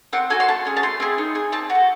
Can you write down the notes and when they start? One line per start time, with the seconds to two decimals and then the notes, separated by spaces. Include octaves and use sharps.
0.13 C4 F#5
0.30 F#4 A4 G#5
0.40 C6
0.48 A3 A5
0.65 C#4 G#4
0.77 A5
0.83 A3 C6
1.00 C4 E4 G#4
1.18 D#4
1.35 G#4
1.52 C4 A5
1.70 F#4
1.75 A4